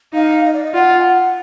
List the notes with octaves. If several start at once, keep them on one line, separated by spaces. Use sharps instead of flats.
D#4 F5
D#5
D5
D#5
F4 F#5
G#5
F#5